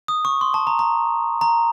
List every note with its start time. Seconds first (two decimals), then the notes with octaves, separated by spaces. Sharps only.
0.08 D#6
0.25 C#6
0.41 C6
0.54 A5
0.67 A#5
0.79 A#5
1.41 A#5